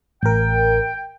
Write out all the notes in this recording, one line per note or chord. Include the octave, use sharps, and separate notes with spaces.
A1 A#4 G5